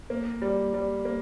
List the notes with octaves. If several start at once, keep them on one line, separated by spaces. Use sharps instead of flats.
A#3
G3
G3
A#3